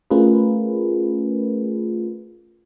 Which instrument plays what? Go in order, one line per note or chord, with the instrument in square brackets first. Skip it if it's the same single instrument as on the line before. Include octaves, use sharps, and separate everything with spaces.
[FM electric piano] A3 C#4 F4 G#4 A#4 B4